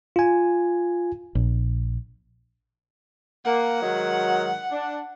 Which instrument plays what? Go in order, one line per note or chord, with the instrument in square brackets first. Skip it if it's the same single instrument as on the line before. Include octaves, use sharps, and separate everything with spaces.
[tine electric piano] F4 G#5
[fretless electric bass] A#1
[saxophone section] A#3 [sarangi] F#5
[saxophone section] G#2 D#3 F#3
D4